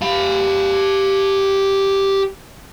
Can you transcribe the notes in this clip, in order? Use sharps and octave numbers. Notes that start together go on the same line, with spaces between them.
G4 F5